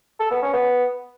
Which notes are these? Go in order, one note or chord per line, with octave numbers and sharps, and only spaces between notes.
A4
B3
C#4
B3